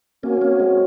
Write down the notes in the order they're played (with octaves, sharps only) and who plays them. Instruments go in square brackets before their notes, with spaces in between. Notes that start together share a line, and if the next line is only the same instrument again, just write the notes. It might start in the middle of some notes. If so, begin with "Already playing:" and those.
[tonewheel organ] A#3 C#4 [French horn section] C4 F#4 C#5
[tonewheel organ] A#3 C#4
G#3